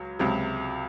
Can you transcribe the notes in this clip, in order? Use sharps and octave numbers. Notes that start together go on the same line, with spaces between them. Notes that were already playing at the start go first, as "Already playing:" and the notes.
Already playing: C#2 F#3
C#2 C3 F#3